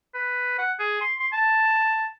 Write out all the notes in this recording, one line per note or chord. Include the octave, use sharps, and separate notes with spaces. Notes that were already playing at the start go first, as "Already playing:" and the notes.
B4
F#5
G#4
C6
C6
A5